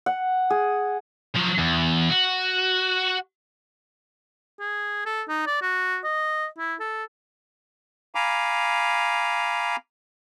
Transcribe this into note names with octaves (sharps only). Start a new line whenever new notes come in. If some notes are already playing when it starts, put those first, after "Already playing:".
F#5
G#4
F3 F#3
E2
F#4
G#4
A4
D#4
D5
F#4
D#5
E4
A4
F5 G#5 A#5 B5 D6